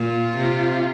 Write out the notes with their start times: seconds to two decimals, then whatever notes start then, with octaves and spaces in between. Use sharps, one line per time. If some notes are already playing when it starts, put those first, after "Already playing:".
Already playing: A#2 F4
0.37 C3